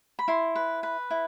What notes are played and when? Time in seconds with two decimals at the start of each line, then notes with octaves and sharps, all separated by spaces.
0.19 B5
0.28 E4 C6
0.56 B4
0.83 B4
1.11 E4